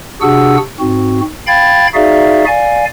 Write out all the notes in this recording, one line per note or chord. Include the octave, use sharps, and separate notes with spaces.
C3 D4 F#4 G#4 F#5 E6
G#2 C4 F#4
F5 G5 B5 G#6 A6
D#4 F#4 G#4 D5 E5 F5
D5 F5 G#5